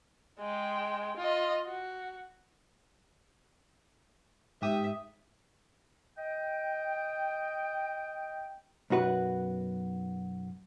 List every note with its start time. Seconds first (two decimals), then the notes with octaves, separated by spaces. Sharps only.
0.40 G#3 G5
1.17 F4 D#5
1.67 F#4
4.62 G#2 G4 E5 D#6
6.17 D#5 G5
8.90 B1 F#2 F#4 B4